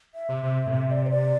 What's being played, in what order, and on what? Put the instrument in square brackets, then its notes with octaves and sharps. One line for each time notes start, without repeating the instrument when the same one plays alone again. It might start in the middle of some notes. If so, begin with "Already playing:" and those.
[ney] E5
[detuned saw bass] C3
C3
A2
[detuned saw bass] C3 [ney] E5
[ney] D5
C5
D5